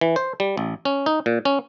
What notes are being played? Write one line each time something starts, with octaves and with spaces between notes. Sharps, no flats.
E3
C5
G3
A1
C#4
D#4
A#2
C#4